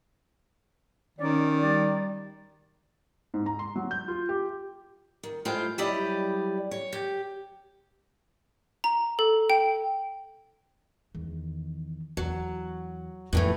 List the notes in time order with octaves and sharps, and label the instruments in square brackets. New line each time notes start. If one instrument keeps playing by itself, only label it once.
[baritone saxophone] D#3 [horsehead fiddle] C#4 [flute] D5
[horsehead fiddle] G3 [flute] D5
[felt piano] G#2
A#5
C6
F#3
G6
F4
G4
[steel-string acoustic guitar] D#3
A2 G#3 F4 C5 G5
F#3 G3 E4 G4 D5 D#5
C#5
G4
[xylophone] A#5
A4
G5
[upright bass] E2 D#3
[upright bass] E2 [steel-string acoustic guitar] F#3
[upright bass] F2 [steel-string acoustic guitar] A2 E3 A3